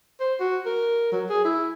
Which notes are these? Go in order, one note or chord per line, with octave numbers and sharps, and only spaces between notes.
C5
F#4
A#4
F#3
G#4
E4